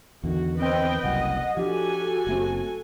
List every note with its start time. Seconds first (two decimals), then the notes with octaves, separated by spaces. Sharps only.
0.24 E2 D3 D#3 F#4
0.58 C4 B4 D#5 G5
1.03 F#1 C2 F#2 D#5 F#5
1.57 F3 D4 F#4 G4 A4 G#5
2.27 F#1 A3 C4